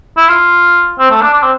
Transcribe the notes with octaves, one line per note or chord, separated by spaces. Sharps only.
E4
F4
C4
A3
D4
D4
C4